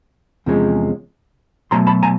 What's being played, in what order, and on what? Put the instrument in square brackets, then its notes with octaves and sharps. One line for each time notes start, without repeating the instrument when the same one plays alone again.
[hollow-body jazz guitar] E2 C3 F3 G#3 C#4
B2 F#3 A3 A#5 C6
A5 B5
G#5 A#5